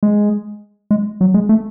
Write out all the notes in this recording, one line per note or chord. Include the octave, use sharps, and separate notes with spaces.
G#3
G#3
F#3
G#3
A3